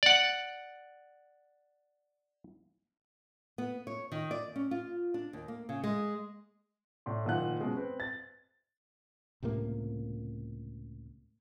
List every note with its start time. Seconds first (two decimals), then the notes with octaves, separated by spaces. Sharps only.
0.03 D5 F#5
3.58 B3
3.87 C#5
4.12 D#3
4.31 D5
4.56 C#4
4.71 F4
5.14 D4
5.33 D#2
5.48 A#3
5.69 C#3
5.84 G#3
7.06 A2 D5 C6
7.25 F#1 A#2 D#3 F4 F#5 F#6
7.60 B2 G#3 C#4
7.76 C4 B4
8.00 A6
9.43 C#2 A2 C3 A#3